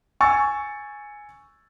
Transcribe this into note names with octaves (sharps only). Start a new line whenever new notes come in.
G#5 C#6 E6 A6